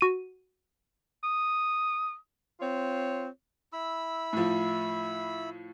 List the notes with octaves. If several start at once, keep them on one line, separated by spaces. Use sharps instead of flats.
F#4 D#7
D#6
C4 F4 C#5
E4 B5 E6
A2 F3